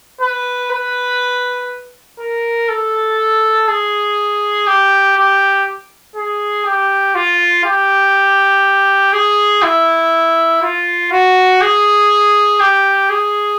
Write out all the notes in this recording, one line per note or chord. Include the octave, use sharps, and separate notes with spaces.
B4
B4
A#4
A4
G#4
G4
G4
G#4
G4
F4
G4
G#4
E4
F4
F#4
G#4
G4
G#4